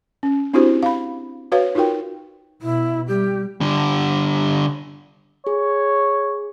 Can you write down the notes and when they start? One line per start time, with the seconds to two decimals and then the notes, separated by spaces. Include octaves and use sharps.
0.23 C#4
0.53 C4 D4 E4 F#4 G4 C5
0.83 F5 B5
1.52 F#4 B4 C#5 F5
1.75 D#4 F4 F#4 A#4 G5
2.61 B2 E4
3.07 G3 G4
3.61 D3 G3
5.47 G#4 C#5